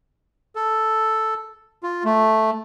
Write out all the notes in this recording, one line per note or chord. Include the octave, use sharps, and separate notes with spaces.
A4
F4
A3